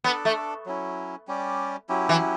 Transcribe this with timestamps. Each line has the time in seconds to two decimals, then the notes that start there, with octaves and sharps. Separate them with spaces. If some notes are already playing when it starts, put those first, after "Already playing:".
0.04 B3 D4 A4 D5
0.25 A3
0.66 F#3 C#4 E4
1.28 G3 C#4 G4 D5
1.89 F#3 C#4 E4 G4
2.09 E3